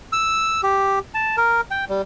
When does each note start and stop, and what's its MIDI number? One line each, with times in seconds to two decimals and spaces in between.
0.13 0.61 88
0.63 0.99 67
1.14 1.36 81
1.37 1.61 70
1.71 1.85 79
1.89 2.02 55